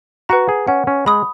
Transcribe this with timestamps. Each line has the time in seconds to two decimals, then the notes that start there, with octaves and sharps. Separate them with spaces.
0.29 F#4 B4 F#5 A#5
0.49 G#4
0.67 C#4 F#5
0.87 C#4
1.06 G#3 B5 D#6